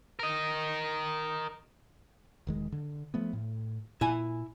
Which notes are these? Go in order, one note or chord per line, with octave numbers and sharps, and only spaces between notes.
A#4 D#5
E1 D#3 G#3
D3
F3 A3 B3
A2
A#2 E4 G#5